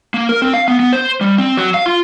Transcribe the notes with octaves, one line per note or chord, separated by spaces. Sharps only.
A#3
A#4
C4
F5
B3
B3
C5
G3
C4
F#3
F5
F4